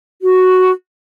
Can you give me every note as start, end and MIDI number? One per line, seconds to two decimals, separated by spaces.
0.23 0.71 66